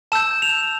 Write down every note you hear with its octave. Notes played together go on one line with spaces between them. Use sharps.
A5 E6 G6 E7
F7